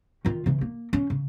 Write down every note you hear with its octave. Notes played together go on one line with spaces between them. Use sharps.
D#3 F4
C#3 E3
A#3
C#4
C#3